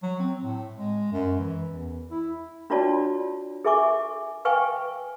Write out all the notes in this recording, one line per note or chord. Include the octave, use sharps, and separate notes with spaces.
F#3
C4
A2
G#3
F#2
E3
E2
E4
D4 F4 F#4 C#5 D5 A5
G#4 A4 E5 G#5 C#6 D6
B4 F5 G5 G#5 C#6